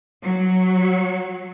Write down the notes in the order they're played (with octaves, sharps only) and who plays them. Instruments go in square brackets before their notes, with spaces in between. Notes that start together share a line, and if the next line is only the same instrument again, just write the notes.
[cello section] F#3